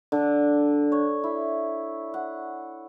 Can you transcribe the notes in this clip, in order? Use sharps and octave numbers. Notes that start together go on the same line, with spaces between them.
D3 D4
C#5
E4
F#5